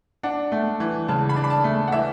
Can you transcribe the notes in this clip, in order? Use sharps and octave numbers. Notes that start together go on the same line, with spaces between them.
D4 F#5
A3
E3
C#3 A5
B5
D4
B5
A5
A3
F#5
E3 E5